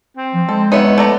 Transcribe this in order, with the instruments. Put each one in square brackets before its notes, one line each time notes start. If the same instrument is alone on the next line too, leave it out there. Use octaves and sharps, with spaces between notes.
[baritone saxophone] C4
[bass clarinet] F3
[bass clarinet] G#3 [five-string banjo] A4
[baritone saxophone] B3 [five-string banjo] D#4 C#5 E5
[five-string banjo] A3 D5 A#5